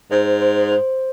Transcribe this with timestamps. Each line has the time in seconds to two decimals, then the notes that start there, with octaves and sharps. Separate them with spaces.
0.11 G#2 C5
0.42 C5
0.72 C5